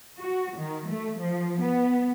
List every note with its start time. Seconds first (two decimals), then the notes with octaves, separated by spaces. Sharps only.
0.18 F#4
0.58 D#3
0.89 A3
1.18 F3
1.61 B3